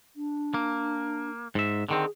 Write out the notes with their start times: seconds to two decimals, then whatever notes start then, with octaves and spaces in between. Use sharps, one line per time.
0.16 D4
0.54 A#3
1.55 G#2 E5
1.89 D3 D#3 C4 G#4